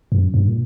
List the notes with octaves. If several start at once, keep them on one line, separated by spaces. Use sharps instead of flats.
F#2
G2
A#2